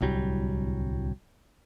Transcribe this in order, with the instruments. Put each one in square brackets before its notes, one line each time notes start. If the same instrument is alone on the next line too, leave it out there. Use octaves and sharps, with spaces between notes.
[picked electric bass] D1 C2 F#3 G3